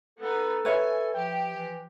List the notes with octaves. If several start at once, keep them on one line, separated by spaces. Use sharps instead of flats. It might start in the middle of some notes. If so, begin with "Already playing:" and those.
B3 D#4 A4
B4 C#5 E5 G#5
F3 G4 G5
E3